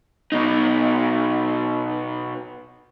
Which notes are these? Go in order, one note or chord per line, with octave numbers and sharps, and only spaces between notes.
B2 D#4